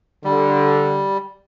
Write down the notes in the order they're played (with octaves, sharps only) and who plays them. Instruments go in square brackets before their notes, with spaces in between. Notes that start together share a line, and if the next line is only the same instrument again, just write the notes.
[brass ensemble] D3 [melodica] G3